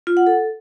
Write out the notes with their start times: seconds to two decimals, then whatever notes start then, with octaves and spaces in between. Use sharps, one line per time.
0.07 F4
0.17 F#5
0.27 A4